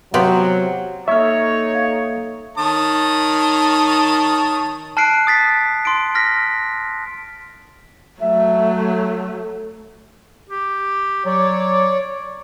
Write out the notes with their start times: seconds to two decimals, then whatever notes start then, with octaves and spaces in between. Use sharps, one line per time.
0.14 C3 F#3 B3 F4 G4
1.08 A#3 D#4 A4 C#5 E5 C#6 F6
1.75 F5
2.58 D#3 C#5 A5 D#6
4.97 A5 F6 F#6 C7 D7
5.27 D#6 A6 B6
5.85 C6 D7
6.15 F6 A#6 B6
8.21 F#3 A3 E5
8.91 A4
10.49 G4
11.25 F#3 C#5 D5